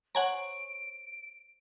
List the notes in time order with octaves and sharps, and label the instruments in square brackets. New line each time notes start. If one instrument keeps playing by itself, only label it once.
[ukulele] C5 C#5 [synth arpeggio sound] F#5 G#5 A#5 [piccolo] D7